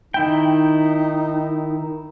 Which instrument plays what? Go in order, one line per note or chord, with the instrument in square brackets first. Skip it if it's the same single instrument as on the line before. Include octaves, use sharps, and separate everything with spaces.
[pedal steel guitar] D#3 E4 G5 [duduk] D#4